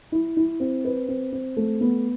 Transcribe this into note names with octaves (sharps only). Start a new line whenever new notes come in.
E4
E4
C4
B4
C4
C4
A3
B3